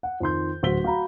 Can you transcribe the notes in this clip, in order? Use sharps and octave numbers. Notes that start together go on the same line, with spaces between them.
F#5
F2 D#3 C6 G6
D1 F#4 C5 B6 G7
F#4 F5 A#5 B5